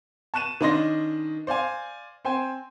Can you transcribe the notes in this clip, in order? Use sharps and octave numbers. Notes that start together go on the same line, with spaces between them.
A5 C#6 F#6 D#7 E7
D#3 C#4 D4 D#5 C6 A#6
C5 D5 F5 G#5
C4 C5 G5 G#5